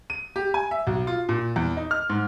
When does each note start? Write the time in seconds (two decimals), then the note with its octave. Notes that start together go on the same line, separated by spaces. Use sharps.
0.10 D#7
0.36 G4
0.54 G#5
0.71 E5
0.87 B1
1.07 F4
1.29 A#2
1.56 E2
1.77 D#4
1.91 F6
2.10 G#2